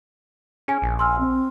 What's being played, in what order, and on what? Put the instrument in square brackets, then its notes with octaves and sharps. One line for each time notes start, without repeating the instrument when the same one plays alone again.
[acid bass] C#4 [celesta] G#4 G#5
[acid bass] A#1
[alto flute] G#5 [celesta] C6 E6 F6
[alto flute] C4